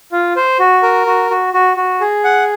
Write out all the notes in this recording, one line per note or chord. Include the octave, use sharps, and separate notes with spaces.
F4
C5
F#4
A#4
F#4
F#4
F#4
F#4
G#4
F#5